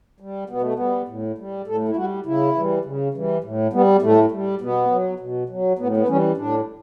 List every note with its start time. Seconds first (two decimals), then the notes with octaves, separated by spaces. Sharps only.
0.20 G3
0.50 B2 B3
0.62 A3
0.74 B3
0.79 G3
1.09 A2
1.38 G3
1.67 A2 A4
1.89 E4
1.96 G3 F#4
2.26 C#3 E4
2.55 E3 G3
2.85 C#3
3.14 E3 G3
3.44 A2
3.73 G3 B3
4.02 A2 A3
4.32 G3
4.61 B2 B3
4.91 F#3
5.20 B2
5.49 F#3
5.79 A2 B3
5.97 B3
6.08 E3 G3 C#4
6.37 A2 D4